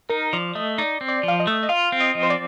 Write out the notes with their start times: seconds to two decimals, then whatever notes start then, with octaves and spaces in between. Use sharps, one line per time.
0.10 D#4 A#4
0.33 F3 D5
0.55 A3 D#5
0.78 D#4 D5
1.01 C4
1.08 D5
1.23 F3 F5
1.40 D#5
1.47 A3
1.63 D#5
1.69 F4 F5
1.92 C4
2.00 D#5
2.15 F3
2.23 C5
2.30 D5